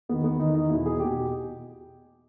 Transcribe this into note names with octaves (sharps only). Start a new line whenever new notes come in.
E2 D#3 B3
B3
E2 D#3 D#4
D#4
E2 B2 E4
G#4
B2 G4